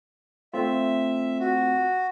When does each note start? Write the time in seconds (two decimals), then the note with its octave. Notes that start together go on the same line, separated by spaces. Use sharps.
0.54 A3 C4 F4 E5
1.40 F#4